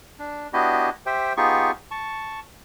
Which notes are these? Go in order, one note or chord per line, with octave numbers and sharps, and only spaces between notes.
D4
B3 D4 E4 F#4 G4 D#5
G4 C5 E5 G5
B3 D#4 F4 G4 G#4 C#6
A5 C#6